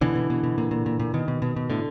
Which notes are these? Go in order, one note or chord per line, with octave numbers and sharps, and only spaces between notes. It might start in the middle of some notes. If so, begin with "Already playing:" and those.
B2 D3 E3
B2
B2
B2
A#2
A#2
A#2
A#2
B2 D#3
B2
B2
B2
A2 D3